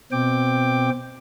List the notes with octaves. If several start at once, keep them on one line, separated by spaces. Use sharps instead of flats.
B2 C4 G5 D6